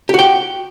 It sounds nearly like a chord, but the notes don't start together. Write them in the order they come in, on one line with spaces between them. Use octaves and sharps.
G4 F#4 G5